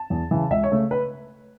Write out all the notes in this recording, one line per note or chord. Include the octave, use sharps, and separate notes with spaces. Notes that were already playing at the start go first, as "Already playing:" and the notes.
Already playing: A5
E2
C#3 E3
C#2 E5
C#5
C#3 A3
B4